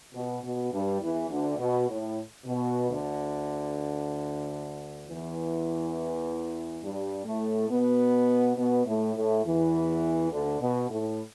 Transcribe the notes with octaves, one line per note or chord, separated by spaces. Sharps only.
B2
B2
G2 G3
E2 E3
D2 D3
B2
A2
B2
D2 D3
E2 E3
G2 G3
A2 A3
B2 B3
B2 B3
A2 A3
A2 A3
E2 E3
D2 D3
B2
A2